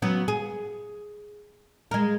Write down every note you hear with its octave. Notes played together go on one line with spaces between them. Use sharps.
F#3 B3 C#4
G#4
G#3 A#4